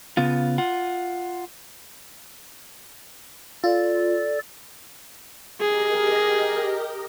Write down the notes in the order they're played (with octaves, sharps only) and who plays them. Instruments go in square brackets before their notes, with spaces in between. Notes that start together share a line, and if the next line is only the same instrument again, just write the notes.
[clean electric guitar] C#3 B3 F4
F4 F#5
[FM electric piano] F4 [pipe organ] A4 D5
[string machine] G4 A#4 D#5 [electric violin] G#4